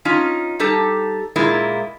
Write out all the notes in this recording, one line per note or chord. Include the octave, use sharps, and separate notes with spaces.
C#4 D#4 F4
G3 D#4 G4 A4
A#2 G#3 A#3 E4 F4